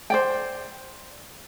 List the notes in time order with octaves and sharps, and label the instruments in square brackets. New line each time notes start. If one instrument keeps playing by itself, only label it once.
[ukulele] C5 D5 G5